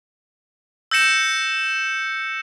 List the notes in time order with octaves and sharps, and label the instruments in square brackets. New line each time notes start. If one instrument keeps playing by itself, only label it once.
[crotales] E6 G6 A#6 C#7 E7